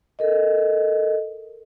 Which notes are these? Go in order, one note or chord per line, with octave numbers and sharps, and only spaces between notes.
A4 A#4 D#5